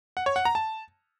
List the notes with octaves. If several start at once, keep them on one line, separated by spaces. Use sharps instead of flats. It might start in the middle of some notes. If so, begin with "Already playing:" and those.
F#5
C#5
F#5
A#5
A5